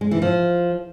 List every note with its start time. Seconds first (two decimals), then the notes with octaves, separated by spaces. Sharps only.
0.01 G#3
0.11 E3
0.22 F3